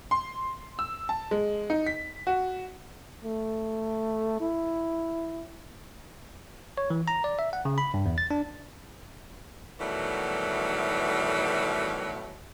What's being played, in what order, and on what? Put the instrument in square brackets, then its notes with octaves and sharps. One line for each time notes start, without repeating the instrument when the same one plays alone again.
[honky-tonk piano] C6
E6
A5
G#3
D#4
B6
F#4
[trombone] A3
E4
[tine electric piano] C#5
E3
A#5
D5
E5
F#5
C#3
B5
G2
E2
A6
D4
[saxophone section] B2 D#3 E3 F#3 G3 A3